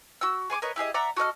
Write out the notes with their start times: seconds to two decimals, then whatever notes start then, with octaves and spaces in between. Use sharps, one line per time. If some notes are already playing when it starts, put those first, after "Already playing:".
0.21 F#4 E6
0.50 G#4 G#5 C#6 D6
0.62 A#4 B4 C#5 D#5
0.76 E4 G4 G#4 D#5
0.94 D5 E5 F#5 A#5
1.16 F#4 A4 D#5 F6